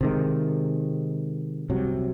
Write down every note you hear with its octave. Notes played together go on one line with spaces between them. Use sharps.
C3 D#3 G#3
C2 C3 F#3